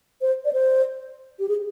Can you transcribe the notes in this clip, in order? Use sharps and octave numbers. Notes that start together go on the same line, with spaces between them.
C5
D5
C5
G4
G#4